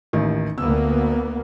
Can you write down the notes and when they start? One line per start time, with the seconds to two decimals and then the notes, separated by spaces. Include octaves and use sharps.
0.13 A1 D#2 D#3
0.58 D2 A#3 B3 E6